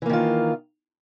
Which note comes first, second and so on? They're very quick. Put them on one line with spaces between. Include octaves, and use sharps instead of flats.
E3 A#3 D#3 F4